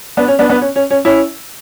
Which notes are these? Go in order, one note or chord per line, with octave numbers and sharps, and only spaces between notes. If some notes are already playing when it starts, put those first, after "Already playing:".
B3 D4
C#4
B3 D4
B3 D4
C#4
C#4
C#4
C#4 E4